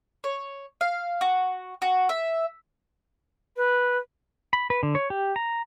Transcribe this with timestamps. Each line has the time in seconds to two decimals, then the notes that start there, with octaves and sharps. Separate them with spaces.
0.24 C#5
0.81 F5
1.21 F#4
1.82 F#4
2.09 E5
3.56 B4
4.53 B5
4.70 B4
4.83 D3
4.95 C#5
5.10 G4
5.36 A#5